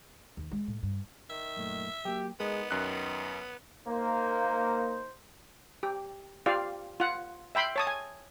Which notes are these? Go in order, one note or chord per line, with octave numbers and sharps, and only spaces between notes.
D#2
G#3
A2
G2
D#3 E5
F#2 A#2 A3
F#3 A3 A#3 G4
G#3 B3 D#4 A#4
F#2 D#3 F#6
A#3 D#4 C5
G4
F4 G4 D5 F5
F4 F#5
E5 G5 B5 C6
C#5 A5 D#6
G#5